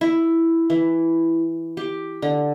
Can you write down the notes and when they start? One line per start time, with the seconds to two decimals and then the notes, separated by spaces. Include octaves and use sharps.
0.01 E4
0.70 E3
1.77 G4
2.22 D3